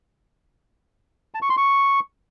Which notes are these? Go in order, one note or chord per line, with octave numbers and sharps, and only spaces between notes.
A5
C#6
C6
C#6